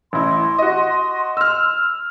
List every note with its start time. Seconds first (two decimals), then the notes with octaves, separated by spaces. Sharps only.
0.13 A1 E4 C6
0.58 F#4 D#5
1.37 E6 F6